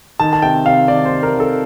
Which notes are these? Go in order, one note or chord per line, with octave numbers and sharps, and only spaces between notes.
D#3 A5
A5
C3 G5
C3 F5
D#3 D5
C5
C3
A#4
D#3
A4